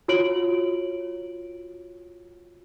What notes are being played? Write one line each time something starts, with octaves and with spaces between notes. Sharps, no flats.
F4 F#4 C#5 D7 F#7